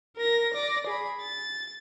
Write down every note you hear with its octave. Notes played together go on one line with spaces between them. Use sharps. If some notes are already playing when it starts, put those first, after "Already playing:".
A#4 A#6
D5 A#6
G#4 B5
A6